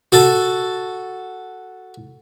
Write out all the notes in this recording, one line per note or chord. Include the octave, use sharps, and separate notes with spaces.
F#4 A4 A5